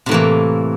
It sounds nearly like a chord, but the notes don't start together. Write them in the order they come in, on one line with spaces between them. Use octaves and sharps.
C3 A2 E3 A#3